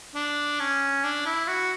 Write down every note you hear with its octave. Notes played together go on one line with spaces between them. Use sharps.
D4
C#4
D4
E4
F#4